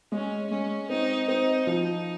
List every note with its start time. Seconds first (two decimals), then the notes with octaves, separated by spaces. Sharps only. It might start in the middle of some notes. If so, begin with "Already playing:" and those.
0.12 G#3 C#4
0.50 G#3 C#4
0.89 C4 D#4
1.27 C4 D#4
1.66 F3 D#4